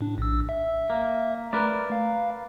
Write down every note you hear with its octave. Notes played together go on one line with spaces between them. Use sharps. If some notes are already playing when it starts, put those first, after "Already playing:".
A2 D4
A#1 E6
E5
A#3
A3 A#4 B4 D5
F5